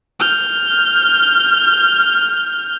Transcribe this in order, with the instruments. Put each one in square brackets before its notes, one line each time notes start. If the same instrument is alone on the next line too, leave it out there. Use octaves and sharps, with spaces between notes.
[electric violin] F6 G6